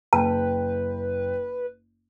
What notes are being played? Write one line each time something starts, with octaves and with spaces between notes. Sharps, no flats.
F#1 B4 G5 A5